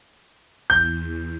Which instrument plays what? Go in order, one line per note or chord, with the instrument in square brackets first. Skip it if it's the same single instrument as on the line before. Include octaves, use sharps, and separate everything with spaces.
[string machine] E2 [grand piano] G6